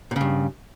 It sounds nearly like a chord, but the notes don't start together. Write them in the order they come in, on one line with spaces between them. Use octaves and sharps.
A#2 C#3 G2